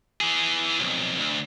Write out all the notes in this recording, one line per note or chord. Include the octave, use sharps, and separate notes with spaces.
E3 G#4
B1 F2
D2